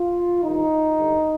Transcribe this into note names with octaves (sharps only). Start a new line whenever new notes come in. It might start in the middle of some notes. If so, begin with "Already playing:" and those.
Already playing: F4
G2 D#3 D#4
G2 D3